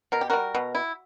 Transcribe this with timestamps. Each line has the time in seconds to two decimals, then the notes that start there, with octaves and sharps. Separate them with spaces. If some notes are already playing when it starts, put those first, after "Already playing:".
0.12 B2 A#4
0.21 G4
0.30 G3 F#4 A#4
0.55 B2
0.75 E4